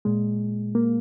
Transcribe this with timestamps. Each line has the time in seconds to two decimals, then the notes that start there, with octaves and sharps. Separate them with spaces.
0.05 A#2 G#3
0.75 A#3